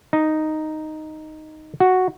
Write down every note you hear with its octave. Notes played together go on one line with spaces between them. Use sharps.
D#4
F#4